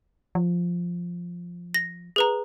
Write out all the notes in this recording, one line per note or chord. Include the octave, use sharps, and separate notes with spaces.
F3
A#6
G#4 B4 A#5